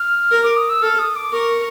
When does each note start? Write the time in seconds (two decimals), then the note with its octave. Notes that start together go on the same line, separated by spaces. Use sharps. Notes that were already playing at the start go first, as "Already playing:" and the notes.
Already playing: F6
0.31 A#4
0.43 D6
0.56 D#6
0.70 E6
0.82 A4 F6
0.99 D#6
1.16 D6
1.32 A#4 C#6